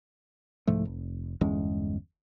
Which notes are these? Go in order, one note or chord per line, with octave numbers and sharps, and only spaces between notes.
C2 G#2 F3 A3
F1
G1 E2 G#3 C#4